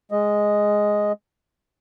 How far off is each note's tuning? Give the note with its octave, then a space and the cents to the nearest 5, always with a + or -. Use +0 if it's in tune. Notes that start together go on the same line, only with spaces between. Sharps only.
G#3 +0 D#5 +0